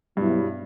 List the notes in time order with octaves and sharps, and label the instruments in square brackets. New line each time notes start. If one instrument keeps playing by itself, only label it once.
[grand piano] G2 [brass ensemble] B2 F#3 B3 E4